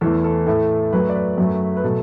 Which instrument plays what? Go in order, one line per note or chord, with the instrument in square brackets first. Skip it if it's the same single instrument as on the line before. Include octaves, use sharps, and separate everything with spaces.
[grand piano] E2 E3 A3 A4
A4
A2 A3 A4
F#2 F#3 A3 B4
D5
B4
F#2 F#3 A3
B4
B2 F#3 A3 A4